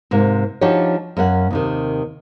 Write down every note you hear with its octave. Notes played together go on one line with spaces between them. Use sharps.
G#2 C3 A#3
F3 D4 D#4 F#4 G4 C#5
F#2 A#3 C#4 F#5
D#2 C3 D#3